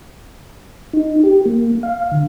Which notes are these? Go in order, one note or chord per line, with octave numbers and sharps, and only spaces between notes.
D#4
G4
A#3
F5
D3